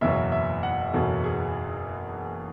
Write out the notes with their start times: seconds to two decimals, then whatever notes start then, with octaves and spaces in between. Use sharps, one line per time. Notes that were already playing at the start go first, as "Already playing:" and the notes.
0.01 F#1 E2 B2 F#3 E5
0.32 E5
0.63 F#5
0.93 F#1 E2 B2 F#3 A4
1.24 G#4